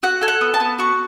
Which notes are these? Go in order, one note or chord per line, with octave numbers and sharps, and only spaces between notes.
F#4 F#5
A4 G#5
F#5
B3
A5
B3
F#4 C#6